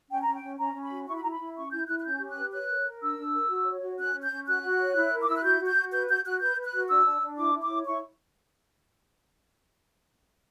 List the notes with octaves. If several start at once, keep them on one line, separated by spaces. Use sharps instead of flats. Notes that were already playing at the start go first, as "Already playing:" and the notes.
C#4 G5
C#4 A#5
G5
C#4
C#4 A#5
C#4
B5
F#4
E4 C#6
B5
E4 A#5
B5
E4
C#4 C#6
E4 G6
E4 F#6
F#6
C#4 G6
G4
F#6
B4
C#5 F#6
A#4
A#4
D4 E6
D4
A#4
F#4
C#5
F#4
C#4 F#6
C#4
G6
C#4
F#4 F#6
F#4
C#5
E4
A#4
D6
E4 E6
F#6
F#4 G6
F#4
G6
F#4
B4 G6
F#4 G6
F#4 F#6
B4 G6
B4
F#6
F#4
D4 E6
D4
D4
E4 D6
E4
D6
C#5
E4 C#6